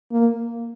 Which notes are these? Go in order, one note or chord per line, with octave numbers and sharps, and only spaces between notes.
A#3